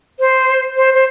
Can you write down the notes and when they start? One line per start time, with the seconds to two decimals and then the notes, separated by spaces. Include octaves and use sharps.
0.20 C5
0.76 C5
0.94 C5